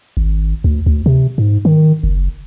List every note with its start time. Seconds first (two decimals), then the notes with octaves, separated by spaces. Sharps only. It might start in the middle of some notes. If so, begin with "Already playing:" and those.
0.17 G#1
0.64 D2
0.86 D2
1.06 C3
1.38 G#2
1.65 D#3
2.03 F#1